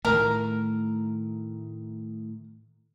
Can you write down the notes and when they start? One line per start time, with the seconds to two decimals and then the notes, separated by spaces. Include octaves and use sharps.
0.05 A2 D#3 A3 A#4